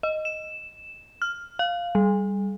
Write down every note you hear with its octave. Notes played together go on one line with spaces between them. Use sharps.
D#5
E7
F6
F5
G3